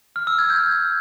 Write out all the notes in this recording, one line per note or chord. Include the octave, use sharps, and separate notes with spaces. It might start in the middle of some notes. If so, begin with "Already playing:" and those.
F6
E6
G#6
G6